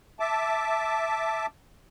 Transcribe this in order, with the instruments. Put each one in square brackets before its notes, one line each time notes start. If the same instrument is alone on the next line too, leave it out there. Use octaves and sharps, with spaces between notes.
[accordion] E5 A5 D6